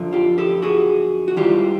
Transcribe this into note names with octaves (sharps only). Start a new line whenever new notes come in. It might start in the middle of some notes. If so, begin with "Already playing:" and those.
Already playing: F#2 D3 F3
F4 G4
G4 A4
F#4 G#4
F#4
G#2 E3 G3 F4 G4